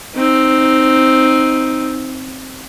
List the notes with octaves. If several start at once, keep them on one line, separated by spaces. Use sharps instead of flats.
C4 D#4